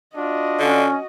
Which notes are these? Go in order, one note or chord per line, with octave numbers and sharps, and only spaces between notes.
D4 F4 F#4 D#5
D3 C#4